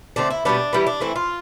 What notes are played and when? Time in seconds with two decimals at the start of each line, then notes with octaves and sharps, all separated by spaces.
0.16 D3 A3 C4 D4
0.30 E4
0.45 B2 G3 B3 D4
0.73 E3 G3 B3 E4
0.87 D4
1.01 E3 A3 C4 E4
1.16 F4